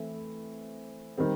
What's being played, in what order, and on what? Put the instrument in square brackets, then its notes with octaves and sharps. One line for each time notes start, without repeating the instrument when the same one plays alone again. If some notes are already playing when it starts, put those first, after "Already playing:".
Already playing: [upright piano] E3 A3 C4 E4
D#3 G3 C4